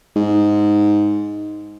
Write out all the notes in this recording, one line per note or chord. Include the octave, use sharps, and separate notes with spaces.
G#2